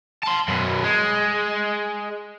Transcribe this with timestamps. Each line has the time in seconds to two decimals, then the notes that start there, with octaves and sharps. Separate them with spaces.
0.23 A5 C6
0.48 F#2 B2
0.84 G#3